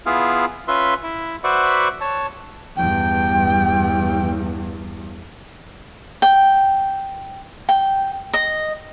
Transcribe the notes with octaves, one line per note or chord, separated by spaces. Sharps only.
B3 E4 F4 G#4 F5
C#4 F4 B4 E5 C6
E4
F#4 B4 C5 D5 E5 F#5
C#5 A5
E2 G2 G5
G5
G5
D#5